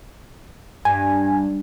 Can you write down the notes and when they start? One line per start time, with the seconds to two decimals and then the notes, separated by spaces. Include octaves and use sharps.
0.85 G2 G#5